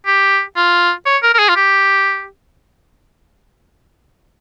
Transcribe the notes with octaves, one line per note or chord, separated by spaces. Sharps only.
G4
F4
C#5
A#4
A#4
G#4
F4
G4